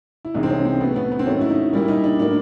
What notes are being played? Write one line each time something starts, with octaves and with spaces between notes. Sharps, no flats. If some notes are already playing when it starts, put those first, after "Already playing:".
E4
C2 C3 E3 G#3 D#4
C4
C#4
C4
A2 F#3 A3 B3
B3
B3
C4
G#2 D#3 F#3 A3 C#4
E4
D#4
A#2 G3 A#3 E4
D#4
D4
A2 F#3 A#3 D4